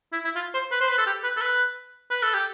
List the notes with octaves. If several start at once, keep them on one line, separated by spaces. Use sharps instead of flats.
E4
E4
F4
C5
B4
C5
B4
A4
G4
B4
A4
B4
B4
A4
G4